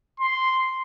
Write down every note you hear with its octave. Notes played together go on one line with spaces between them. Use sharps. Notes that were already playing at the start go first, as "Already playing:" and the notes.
C6